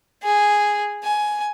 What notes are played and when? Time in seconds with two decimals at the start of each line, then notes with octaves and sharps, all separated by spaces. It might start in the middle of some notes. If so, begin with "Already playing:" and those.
0.23 G#4
1.04 G#5